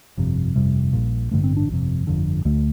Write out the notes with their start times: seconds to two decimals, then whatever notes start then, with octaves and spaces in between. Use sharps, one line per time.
0.17 G1 F2 C3
0.56 G1 F2 C3 G3
0.93 A#1 A#2
1.31 A1 G2 D3 A3
1.44 C4
1.57 D4
1.69 G1 F2 C3
2.07 G1 F2 D3
2.45 D2 D3 A3